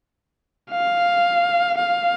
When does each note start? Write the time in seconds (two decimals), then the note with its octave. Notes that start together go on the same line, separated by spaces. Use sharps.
0.71 F5
1.78 F5